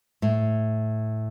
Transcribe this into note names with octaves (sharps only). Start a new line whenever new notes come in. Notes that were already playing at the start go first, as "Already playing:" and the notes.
A2